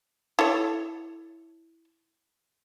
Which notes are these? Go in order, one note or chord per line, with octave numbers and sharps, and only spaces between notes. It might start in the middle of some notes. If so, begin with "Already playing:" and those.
E4 A4 C#5